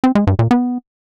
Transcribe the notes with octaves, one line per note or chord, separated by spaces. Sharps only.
C4
G#3
G2
A#2
B3